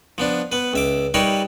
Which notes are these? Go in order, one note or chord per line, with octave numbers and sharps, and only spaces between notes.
F3 B3 D4
B3 B4
C#2 E5 D6
G3 D#4 A#4 B4 C#5 E5